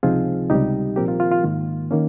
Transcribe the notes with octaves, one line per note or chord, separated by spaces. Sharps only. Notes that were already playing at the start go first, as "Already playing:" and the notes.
C#2 C3 F3 C4 D#4 F4 G#4
C#2 C3 G3 D#4 G4
C2 A#2 F3 C4 G4 A#4
F4
F4
F4
G#2 D#3 A#3
D#3 A#3 C#4